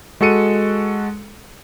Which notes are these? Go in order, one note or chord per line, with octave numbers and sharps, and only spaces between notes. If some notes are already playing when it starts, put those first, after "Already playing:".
G#3 F#4 A4 C#7 D#7